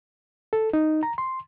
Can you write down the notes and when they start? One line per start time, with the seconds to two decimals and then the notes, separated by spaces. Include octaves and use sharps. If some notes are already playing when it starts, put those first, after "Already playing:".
0.53 A4
0.73 D#4
1.03 A#5
1.18 C6